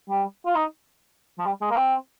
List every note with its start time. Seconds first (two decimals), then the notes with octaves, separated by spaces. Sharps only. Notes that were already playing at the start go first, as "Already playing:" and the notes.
0.09 G3
0.46 F4
0.55 D#4
1.39 F3
1.46 G3
1.61 G#3
1.71 A#3
1.76 C4